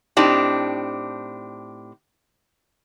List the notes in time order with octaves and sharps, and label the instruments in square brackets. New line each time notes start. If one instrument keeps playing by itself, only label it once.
[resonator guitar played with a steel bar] A2 C4 D4 D#4 G4